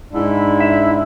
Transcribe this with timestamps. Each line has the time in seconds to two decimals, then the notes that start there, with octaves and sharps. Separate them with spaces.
0.14 G#2 D4 E4
0.60 E5